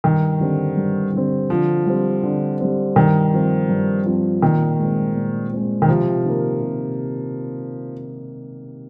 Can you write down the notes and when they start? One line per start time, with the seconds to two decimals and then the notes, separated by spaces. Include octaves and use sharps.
0.04 G2 D#3
0.40 D3 G3 C4
0.77 G2
1.13 D3 G3 C4
1.50 D3 F3
1.87 G3 C4
2.23 D3
2.60 G3 C4
2.96 G2 D#3
3.33 F3 C4 F4
3.69 G2
4.06 F3 C4 F4
4.42 A#2 D#3
4.79 G#3 C4
5.15 A#2
5.52 G#3 C4
5.82 D#3
5.88 C3 F3
6.25 D#3 A#3
6.61 C3